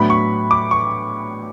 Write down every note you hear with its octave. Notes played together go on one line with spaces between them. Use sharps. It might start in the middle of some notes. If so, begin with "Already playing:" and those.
Already playing: A2 F#3 B3 D4 B5
C#6
D6
C#6